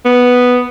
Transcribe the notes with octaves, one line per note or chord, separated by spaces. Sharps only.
B3